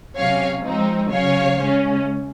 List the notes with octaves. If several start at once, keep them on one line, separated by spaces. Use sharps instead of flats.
C3 F#3 C#4 C#5 F5
F3 G#3 C4 D#4
C#3 F#3 C#4 C#5 F5
C#3 G#3 C#4